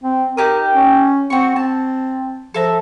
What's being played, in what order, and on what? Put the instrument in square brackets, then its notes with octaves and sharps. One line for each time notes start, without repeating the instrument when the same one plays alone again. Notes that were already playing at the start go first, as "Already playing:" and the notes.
[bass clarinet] C4
[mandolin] D#4 G4 D#6 [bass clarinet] A#4
[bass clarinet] C#4
[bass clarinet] C4 [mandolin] F#4 C#6
[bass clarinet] C4 [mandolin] A5
[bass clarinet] F3 [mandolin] A4 E5 A#5